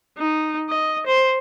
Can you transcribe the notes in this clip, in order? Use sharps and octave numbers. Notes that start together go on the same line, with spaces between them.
D#4
D#5
C5